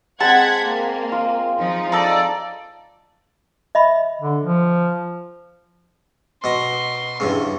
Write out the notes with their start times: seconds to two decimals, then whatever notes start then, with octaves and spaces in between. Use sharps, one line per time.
0.20 G#3 C4 F#5 A5 G#6 B6
0.65 A#3
1.12 F4
1.58 F3 D#4
1.92 D#4 A4 D5
3.75 D#5 E5 B5
4.21 D3
4.43 F3
6.44 B2 D#5 C6
7.20 E2 G2 C#3